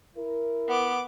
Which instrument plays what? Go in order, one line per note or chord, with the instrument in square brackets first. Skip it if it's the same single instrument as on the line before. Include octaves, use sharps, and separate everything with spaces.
[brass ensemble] E4 A#4
[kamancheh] B3 D6